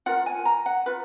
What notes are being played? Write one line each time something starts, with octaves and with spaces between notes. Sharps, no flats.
F4 A#4 F#5
G#5
A#5
F#5
F4 B4